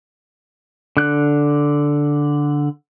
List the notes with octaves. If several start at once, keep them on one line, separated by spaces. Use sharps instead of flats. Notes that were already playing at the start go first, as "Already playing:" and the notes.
D3 F#6